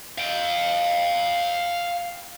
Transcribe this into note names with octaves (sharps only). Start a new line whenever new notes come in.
F5 G5